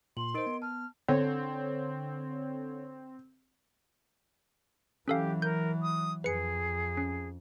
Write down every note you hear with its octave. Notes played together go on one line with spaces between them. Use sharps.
A#2 C6 F#7
D#4 A#4 C5 D#5 D7
B3
A5 F6
D3 C4 C#5
E3 F#3 C#4 G4 A4 F5
A#4 G6
D#6
F2 G#4 B4 C#7
C#4